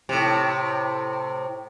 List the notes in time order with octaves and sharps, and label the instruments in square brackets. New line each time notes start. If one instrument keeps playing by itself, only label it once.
[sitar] A2 C3